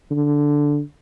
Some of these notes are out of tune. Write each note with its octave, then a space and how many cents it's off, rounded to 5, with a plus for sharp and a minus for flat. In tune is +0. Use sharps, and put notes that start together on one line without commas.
D3 -5